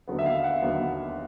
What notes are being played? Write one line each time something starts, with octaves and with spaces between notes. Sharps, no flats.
D#2 D3 F#3 B3
E5
F5
F#5
D#2 D3 F#3 B3